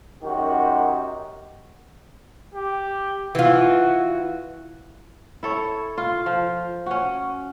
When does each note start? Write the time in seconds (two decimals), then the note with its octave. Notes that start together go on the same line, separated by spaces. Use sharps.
0.23 F#2 D#3 G#3 F#4 G4
2.54 G4
3.35 E3 F4 F#4
5.43 E4 A4 C#5
5.98 F4
6.26 F3
6.86 C#4 F#4